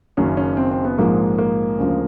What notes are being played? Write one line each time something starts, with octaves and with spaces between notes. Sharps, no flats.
F#1 F#2 D#3 C#4
C#4
C4
C4
B3
A#1 G#2 F3 G#3 A#3
A#3
D2 C#3 F3 G#3